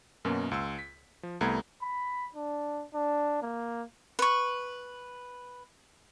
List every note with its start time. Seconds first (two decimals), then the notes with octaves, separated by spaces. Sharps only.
0.25 F#2 B2 A#3 C#4
0.51 C#2 C6 E6
0.79 B6
1.23 F3
1.41 C2 A3 B3 A#5 B5 G#6
1.82 B5
2.35 D4
2.95 D4
3.42 A#3
4.19 B4 C#6